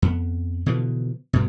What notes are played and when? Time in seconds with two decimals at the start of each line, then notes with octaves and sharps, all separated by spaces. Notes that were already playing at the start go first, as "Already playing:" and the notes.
0.02 F2 B3
0.66 B2 D3 E3 F3
1.33 D2 G2 B2